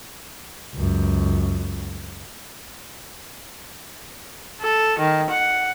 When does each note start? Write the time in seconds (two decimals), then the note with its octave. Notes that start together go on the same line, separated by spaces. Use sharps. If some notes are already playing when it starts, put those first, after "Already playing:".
0.75 C#2 F#2
4.61 A4
4.99 D#3
5.30 F#5